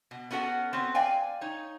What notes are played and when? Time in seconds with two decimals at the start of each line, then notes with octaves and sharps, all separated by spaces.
0.11 B2
0.31 B3 C#4 F#4 A4 F#5
0.73 B3 C4
0.95 D5 F5 G5 G#5
1.41 D#4 C#5